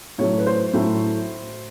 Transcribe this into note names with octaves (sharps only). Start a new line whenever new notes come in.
A2 F#3 A3 C#5
B4
C5
A2 F#3 A3